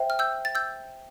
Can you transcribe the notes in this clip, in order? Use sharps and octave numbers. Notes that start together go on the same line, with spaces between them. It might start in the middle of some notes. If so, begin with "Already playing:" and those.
Already playing: C5 E5 G5
F6
E6 G6
A6
E6 G6